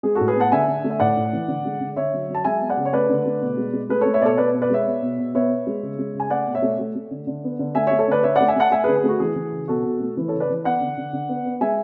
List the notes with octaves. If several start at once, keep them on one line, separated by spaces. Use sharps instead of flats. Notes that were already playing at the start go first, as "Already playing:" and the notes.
G#3 G#4
A2 F#4 A4
G#4 B4
B3 F#5 A5
D3 E5 G#5
D3
A3
E5
A2 D5 F#5
A2
E3
D3
G#3
D3
D3 C#5 E5
F#3
F#3
A5
G#3 E5 G#5
B3
D5 F#5
C#3
C#5
A3 B4 D5
D3
A3
B2
G#3
G#3
A3 G#4 B4
A3 A4 C#5
C#5 E5
B2 A4 C#5 D5
B2 B4 D5
B2
B4 D5
G#3 C#5 E5
B3
B2
B2
B3 C#5 E5
B3
G#3
C#3
G#3
C#3
G#5
A3 D5 F#5
B2
C#5 E5
A3
A3
A3
D3
D3
B3
D3
A3 E5 G#5
A3 C#5 E5
A4 C#5
D3 B4 D5
D3 C#5 E5
A3 D5 F#5
E5 G#5
A3 F#5 A5
A3 E5 G#5
D3 G#4 B4
G#4
A3 F#4
E3 G#4
E3
C#3
B2 F#4 A4
B2
A3
E3
C#3 A4 C#5
B4 D5
E3
B3 D5 F#5
D3
D3
D3
B3
B3
G#3 E5 G#5